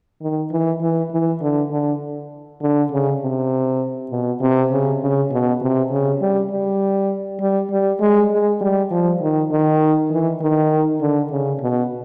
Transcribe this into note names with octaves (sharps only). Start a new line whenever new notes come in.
D#3
E3
E3
E3
D3
D3
D3
C#3
C3
B2
C3
C#3
C#3
B2
C3
C#3
G3
G3
G3
G3
G#3
G#3
G3
F3
D#3
D#3
E3
D#3
D3
C#3
B2